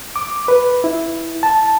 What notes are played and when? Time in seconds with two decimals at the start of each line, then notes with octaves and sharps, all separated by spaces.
0.16 D6
0.48 B4
0.84 E4
1.43 A5